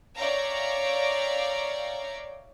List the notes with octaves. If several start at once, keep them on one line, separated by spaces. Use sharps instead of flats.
C#5 D5 E5 F5 G5 A#5